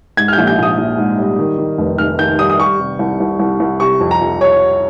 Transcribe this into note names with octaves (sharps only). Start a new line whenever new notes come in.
G#2 G#6
F6
G6
A#1
G6
A#1 D#6
A#1
G#2
G3
D#3
D#3
F1
F1 F6
D#3 G6
G3 D#6
D#6
G3 C#6
C3
C2
C2
C2
C2
C3 C#6
F2
A#5
F2
C#5